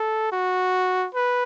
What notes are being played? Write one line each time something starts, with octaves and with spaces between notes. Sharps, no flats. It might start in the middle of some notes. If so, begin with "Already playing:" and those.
Already playing: A4
F#4
B4